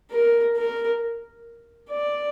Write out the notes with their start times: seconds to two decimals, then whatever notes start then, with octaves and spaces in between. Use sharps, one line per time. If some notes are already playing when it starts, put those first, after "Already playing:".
0.11 A#4
0.56 A#4
1.90 D5